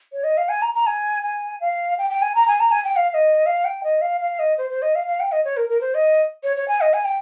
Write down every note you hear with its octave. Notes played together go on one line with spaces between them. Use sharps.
C#5
D#5
F5
G#5
A#5
A#5
G#5
G#5
F5
G5
G5
G#5
A#5
G#5
A#5
G#5
G5
F5
F5
D#5
F5
G5
D#5
F5
F5
D#5
C5
C5
D#5
F5
F5
G5
D#5
C#5
A#4
A#4
C5
D#5
C#5
C#5
G#5
D#5
G#5
G5